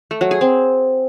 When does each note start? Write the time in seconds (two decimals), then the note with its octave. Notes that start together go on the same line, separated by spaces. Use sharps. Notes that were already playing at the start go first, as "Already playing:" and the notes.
0.11 A3
0.21 F#3
0.31 G#4
0.41 C4